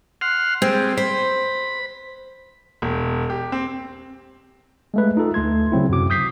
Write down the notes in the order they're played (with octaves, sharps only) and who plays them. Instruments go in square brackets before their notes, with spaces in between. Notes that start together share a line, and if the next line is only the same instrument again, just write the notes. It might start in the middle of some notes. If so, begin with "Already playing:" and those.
[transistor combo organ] F#5 C6 F6
[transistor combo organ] G3 G#3 [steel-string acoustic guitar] C4
[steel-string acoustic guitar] C5 [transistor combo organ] B5
[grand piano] E1
G4
C4
[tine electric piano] G#3 A3 B4
D#4 F4 A4
D2 A3 C6 G#6
C#3 F#3 C4 E4
F#2 C3 F#4 D6
D#6 G6 B6 C7